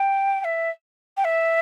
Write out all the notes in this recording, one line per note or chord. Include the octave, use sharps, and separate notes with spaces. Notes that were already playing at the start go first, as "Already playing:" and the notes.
Already playing: G5
G5
E5
G5
E5